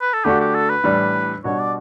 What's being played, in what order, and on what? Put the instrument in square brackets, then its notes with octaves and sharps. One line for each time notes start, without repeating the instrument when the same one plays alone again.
[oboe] B4
A4
[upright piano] D3 A3 D4 F#4 [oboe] G4
[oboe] G4
A4
B4
[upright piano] A2 E3 G3 D4
[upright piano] B2 G3 D4 F#4 [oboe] C#5
[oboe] D5